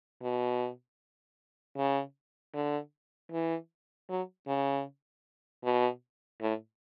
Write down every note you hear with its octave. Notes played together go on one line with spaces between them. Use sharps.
B2
C#3
D3
E3
F#3
C#3
B2
A2